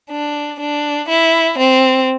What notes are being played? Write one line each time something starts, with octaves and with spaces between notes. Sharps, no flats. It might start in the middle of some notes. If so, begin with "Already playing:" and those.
D4
D4
E4
C4